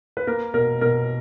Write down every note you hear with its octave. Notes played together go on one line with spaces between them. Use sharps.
B4
A#3 A#4
B2 A#4
B2 A#4